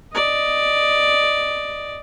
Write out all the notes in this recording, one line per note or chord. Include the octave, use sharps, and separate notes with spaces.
D5 D#5